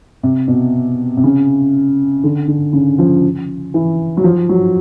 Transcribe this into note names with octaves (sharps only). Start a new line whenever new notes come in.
C3
B2
C3
C#3
D3
D3
C#3
F3
E3
F#3
F3
F#3